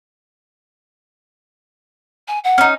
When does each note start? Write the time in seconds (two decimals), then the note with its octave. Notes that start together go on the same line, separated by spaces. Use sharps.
2.28 G#5
2.44 F#5
2.58 C#4 D#4